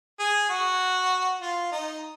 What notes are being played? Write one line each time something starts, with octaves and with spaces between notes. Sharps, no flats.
G#4
F#4
F4
D#4